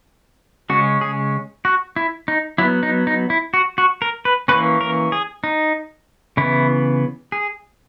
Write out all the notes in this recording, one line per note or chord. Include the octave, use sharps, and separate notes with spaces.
C#3 G#3 C#4 F#4
G#4
F#4
E4
D#4
F#3 B3 E4
D#4
D#4
E4
F#4
F#4
A#4
B4
E3 A#3 C#4 B4
A#4
G#4
D#4
C#3 E3 B3 E4
G#4